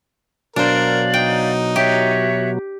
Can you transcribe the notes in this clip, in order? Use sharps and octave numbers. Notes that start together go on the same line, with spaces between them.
B2 F#3 D4 A#4 C5 D5 F5
D#4 G5
F#4 G4 C#5 E5